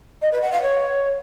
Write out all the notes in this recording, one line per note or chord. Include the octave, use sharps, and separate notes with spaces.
D#5
B4
F#5
F5
C#5